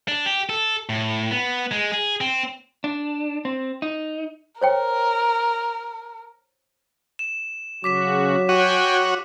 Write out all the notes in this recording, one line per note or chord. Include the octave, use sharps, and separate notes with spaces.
D4
G4
A4
A2
B3
G#3
G#4
C4
D4
C4
D#4
A#4 C5 C#5 G5
E7
C#3 F#3 F#4 D6 B6 E7
F#4 C#5 G5 G#5 D#7